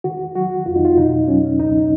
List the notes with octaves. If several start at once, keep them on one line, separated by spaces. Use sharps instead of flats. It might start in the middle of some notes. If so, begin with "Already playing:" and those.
D#3 F#4
F#3 F#4
F2 F4
D#4
F4
B2 D#4
F#3 C#4
C#2 D#4